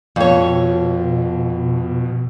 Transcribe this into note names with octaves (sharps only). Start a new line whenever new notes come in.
F2 B2 C#5